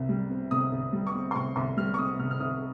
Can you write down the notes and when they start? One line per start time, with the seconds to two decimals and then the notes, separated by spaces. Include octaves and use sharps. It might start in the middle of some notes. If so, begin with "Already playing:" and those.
Already playing: C2 C3
0.09 G3
0.30 C4
0.51 C3 D#6
0.72 C2
0.93 G3
1.07 C#6
1.15 C4
1.31 C6
1.35 C3 C#6
1.56 C2 C6
1.77 G3 F6
1.94 C#6
1.98 C4 D#6
2.19 C3 F6
2.31 F6
2.40 C2 D#6